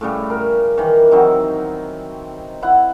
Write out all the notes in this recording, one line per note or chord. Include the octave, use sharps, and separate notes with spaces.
A2 C#3 G3
A#4
D#3 E3
F#3 C4 D#4
E4 F#5